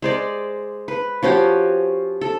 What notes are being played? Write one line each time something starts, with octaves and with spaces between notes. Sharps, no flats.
G#3 C5 D5
B4
F3 C#4 F#4 G4
A4